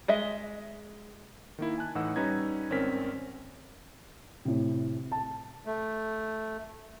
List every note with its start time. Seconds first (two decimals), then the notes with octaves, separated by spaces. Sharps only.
0.08 G#3 D#5 E5
1.58 D#3 A#3 E4
1.78 G#5 A5 F#6
1.95 A2 E3 D#4 F#5 E6
2.16 G3 C#4 D#4 B4 A#5 G#6
2.70 G#1 C4 C#4 A#4 B6
4.45 A2 C3
5.12 A5
5.66 A3